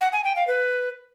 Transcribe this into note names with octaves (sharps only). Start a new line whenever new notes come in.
F#5
G#5
G5
F5
B4